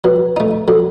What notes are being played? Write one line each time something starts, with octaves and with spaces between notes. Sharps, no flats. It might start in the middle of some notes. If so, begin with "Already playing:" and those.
F#3 B4
A3 D#4
F#3 A4